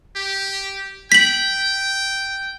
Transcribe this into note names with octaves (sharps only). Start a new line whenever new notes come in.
G4
G5 B6 F#7